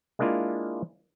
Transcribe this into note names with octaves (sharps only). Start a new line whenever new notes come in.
G#3 A#3 D4 E4 F4